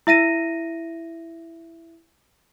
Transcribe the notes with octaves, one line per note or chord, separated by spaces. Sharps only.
E4 E5 A#6 D#7